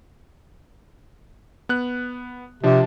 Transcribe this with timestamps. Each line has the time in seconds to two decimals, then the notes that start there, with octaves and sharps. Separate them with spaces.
1.69 B3 F#6
2.63 C3 F3 D4